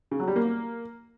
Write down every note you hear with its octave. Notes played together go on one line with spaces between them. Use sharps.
C#3
F#3
G3
A#3